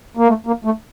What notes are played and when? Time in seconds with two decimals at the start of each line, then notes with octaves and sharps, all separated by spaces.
0.17 A#3
0.28 A3
0.46 A#3
0.64 A3